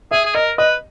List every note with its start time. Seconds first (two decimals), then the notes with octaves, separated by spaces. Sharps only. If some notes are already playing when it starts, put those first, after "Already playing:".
0.11 G#4 E5
0.25 G#4
0.35 A#4 D#5
0.58 B4 D#5